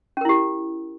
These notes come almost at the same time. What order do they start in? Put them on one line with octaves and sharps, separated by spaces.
C#4 A#4 E4 G4